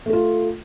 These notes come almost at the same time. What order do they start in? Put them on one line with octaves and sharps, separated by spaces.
A3 A4 F4